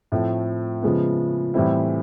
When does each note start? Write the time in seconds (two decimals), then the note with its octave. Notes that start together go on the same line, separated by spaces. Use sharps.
0.12 A2 F3 A3 C4
0.82 C#3 F3 G#3 B3
1.54 A2 E3 G3 C4 E4